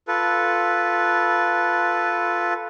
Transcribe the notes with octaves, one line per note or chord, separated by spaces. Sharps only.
F4 A4 B4